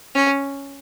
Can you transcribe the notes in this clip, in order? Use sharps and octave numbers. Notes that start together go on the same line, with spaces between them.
C#4